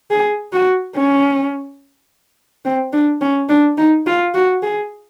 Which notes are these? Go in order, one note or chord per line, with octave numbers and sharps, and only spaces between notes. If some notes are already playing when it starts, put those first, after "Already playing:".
G#4
F#4
C#4
C4
D4
C#4
D4
D#4
F4
F#4
G#4